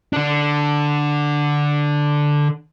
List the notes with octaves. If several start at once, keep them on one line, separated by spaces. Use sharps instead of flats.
D3 D4